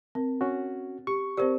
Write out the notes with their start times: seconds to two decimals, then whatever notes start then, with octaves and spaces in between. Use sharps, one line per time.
0.15 C4 A#4
0.41 C#4 F#4
1.07 G4 C#6
1.37 C4 G4 A#4 C5 D5